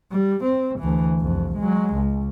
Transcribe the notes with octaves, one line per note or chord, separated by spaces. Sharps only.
G3
C4
D2 E3
C2 F2
F#3 G#3
C#2